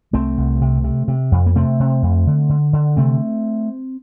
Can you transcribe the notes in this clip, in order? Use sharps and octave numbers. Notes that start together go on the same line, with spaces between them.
C2 A3 C4
C2
C3
C3
C3
F2
A#3
C3 A3 C4
C3
F2
D3
D3
D3
C3 A3 C4